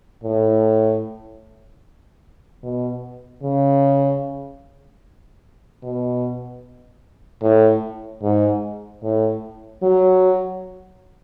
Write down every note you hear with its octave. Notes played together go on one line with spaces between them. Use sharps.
A2
B2
C#3
B2
A2
G#2
A2
F#3